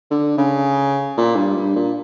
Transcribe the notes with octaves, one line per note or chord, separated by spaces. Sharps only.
D3
C#3
A#2
G2
G2
A#2